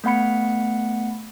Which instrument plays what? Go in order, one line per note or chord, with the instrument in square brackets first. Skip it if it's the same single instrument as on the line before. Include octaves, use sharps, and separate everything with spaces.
[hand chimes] A3 B3 F#5 B5 C#7